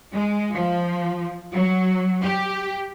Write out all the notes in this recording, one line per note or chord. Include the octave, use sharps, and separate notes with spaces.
G#3
F3
F#3
G4